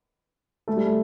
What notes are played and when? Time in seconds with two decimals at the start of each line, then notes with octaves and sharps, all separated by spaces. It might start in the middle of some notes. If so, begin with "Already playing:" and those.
0.68 A3
0.77 G3
0.86 A3